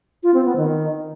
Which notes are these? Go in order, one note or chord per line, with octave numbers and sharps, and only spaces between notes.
F4
C4
B3
D#3